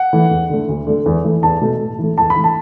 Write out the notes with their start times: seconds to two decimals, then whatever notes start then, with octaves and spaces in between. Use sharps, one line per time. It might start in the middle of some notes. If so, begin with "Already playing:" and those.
Already playing: F#5
0.13 E3 A3
0.31 E2
0.49 D3 A3
0.69 D2
0.87 D3 A3
1.06 E2
1.24 E3 A3
1.43 E2 A5
1.61 B2 A3
1.80 A2
1.99 E3 A3
2.18 E2 A5
2.30 B5
2.36 E3 A3
2.44 A5